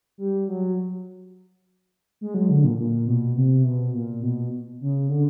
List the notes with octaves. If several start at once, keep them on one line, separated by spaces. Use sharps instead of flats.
G3
F#3
G#3
F#3
D3
A#2
A#2
B2
C3
B2
A#2
B2
C#3
D3